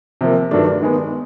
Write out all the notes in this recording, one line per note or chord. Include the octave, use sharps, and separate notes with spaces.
C3 F3 A#3
G2 D#3 F#3 A3 D4
D#3 G#3 B3